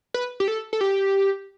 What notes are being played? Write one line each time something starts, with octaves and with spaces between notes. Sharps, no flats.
B4
G4
A4
A4
G4